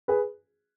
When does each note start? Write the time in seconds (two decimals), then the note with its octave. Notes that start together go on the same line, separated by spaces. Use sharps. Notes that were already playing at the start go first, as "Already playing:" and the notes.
0.08 G#4 B4